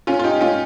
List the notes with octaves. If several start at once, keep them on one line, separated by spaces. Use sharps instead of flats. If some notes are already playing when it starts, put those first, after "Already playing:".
C#4 F4
F4
D#4 G4
C#4 F4